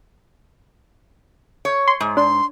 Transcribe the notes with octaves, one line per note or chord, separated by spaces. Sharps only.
C#5
C6
G#2
D4 C6